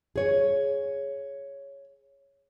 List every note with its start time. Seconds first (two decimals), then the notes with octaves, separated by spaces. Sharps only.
0.16 G#4 C#5